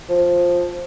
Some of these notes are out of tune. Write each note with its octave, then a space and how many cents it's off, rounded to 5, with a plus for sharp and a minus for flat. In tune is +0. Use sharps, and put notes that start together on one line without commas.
F3 +10